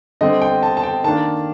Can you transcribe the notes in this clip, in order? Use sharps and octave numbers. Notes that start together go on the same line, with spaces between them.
D3 G3 C4 D#5
G5
A5
A5
G5
D#3 A#3 D4 A5